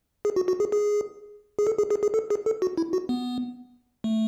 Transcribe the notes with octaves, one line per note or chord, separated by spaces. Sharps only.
G#4
F#4
F#4
G#4
G#4
G#4
A4
G#4
G#4
G#4
A4
G#4
A4
F#4
E4
F#4
B3
A3